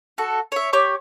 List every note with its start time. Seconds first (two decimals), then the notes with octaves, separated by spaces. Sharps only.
0.18 F#4 A4
0.52 C#5 E5
0.73 G4 C#5 C#6 D6